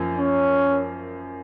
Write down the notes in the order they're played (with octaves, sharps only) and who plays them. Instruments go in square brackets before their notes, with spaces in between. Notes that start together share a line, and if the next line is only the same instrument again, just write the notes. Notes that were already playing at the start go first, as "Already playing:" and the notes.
Already playing: [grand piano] F#2 F3 A#3
[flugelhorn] C#4